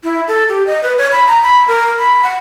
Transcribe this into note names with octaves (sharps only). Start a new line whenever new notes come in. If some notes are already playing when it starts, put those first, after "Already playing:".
E4
A4
G4
D#5
B4
C#5
B5
A#5
B5
A#4
B5
F#5